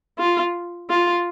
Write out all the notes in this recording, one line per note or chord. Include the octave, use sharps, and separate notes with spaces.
F4
F4